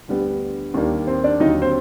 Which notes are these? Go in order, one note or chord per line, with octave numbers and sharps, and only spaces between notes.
D2 D3 G3 B3
D#2 D#3 G3 A#3 D4
C4 C5
D4 D5
D#2 D3 F#3 D#4 D#5
C4 C5